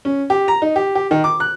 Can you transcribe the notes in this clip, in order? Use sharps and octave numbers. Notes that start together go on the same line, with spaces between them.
C#4
G4
A#5
D#4
G4
G4
D#3
D6
F#6